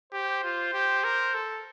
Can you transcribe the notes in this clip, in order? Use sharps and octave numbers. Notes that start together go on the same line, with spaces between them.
G4 C5
F4
G4
A#4
A4